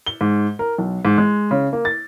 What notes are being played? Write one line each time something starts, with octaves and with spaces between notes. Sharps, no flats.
G7
G#2
A#4
B1
G#2
G#3
C#3
A#3
A6